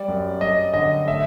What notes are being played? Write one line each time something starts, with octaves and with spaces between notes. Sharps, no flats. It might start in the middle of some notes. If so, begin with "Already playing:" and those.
Already playing: G3 D5
F#2
F#2 D#5
D3 D#5
A3 E5